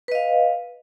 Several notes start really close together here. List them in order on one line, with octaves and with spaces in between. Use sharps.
B4 D#5 F5